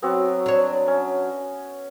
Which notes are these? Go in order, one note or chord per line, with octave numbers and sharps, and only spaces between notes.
F#3 B3 C4 F#4
D4 C#5
C#4